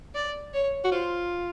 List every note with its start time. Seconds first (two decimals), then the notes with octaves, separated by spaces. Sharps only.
0.15 D5
0.53 C#5
0.84 F#4
0.92 F4 C5